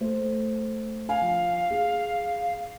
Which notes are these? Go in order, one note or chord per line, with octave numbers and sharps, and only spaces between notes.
A3 C5
F5 G#5
F3
G#4